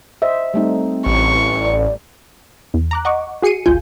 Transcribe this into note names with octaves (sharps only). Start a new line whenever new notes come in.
C5 D#5 E5
G3 A3 C4 D#4
A1 C#6
D5
E2
A#5 D6 F#6
D#5 F#5 C#6 D6
F#4 G#4 C7 C#7 D#7
G1 C#2 F4 G#5 G6